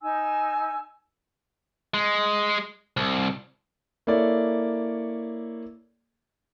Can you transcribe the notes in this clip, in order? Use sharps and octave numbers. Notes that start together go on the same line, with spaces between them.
D#4 G#5 E6
G#3
C2
A#3 E4 A4 C#5 D5